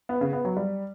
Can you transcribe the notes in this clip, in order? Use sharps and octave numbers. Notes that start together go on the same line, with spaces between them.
B3
C#3
B3
F#3
G3